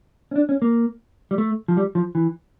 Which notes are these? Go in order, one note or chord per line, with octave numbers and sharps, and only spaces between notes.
C#4
D4
C#4
A#3
G3
A3
F3
G3
F3
E3